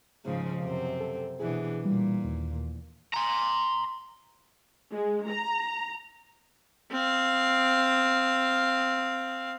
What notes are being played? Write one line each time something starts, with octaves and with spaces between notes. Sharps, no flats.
G#2 C#3 F3
F#2 C3 C4
A4
B2 E3 D4 G#4
A#2 G3
D#2
A#5 C6
G#3
A#5
C4 F5